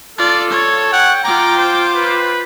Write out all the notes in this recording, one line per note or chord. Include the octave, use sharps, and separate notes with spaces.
F4 A4 D5
C#5
F#5 G5
F4 G5 A#5 D6
C5
B4